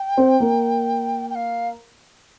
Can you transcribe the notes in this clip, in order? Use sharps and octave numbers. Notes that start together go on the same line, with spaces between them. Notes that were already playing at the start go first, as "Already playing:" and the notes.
Already playing: G5
C4
A#3
G5
F5